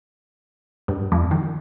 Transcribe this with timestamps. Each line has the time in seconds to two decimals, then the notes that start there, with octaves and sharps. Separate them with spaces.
0.88 G2
1.12 F2
1.31 D#3